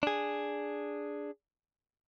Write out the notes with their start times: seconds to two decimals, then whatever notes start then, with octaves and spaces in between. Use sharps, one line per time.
0.03 D4 G#4